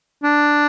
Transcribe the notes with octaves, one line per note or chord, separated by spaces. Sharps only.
D4